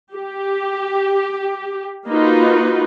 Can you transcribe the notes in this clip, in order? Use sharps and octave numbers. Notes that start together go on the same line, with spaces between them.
G4
A#3 D#4 F4 F#4 B4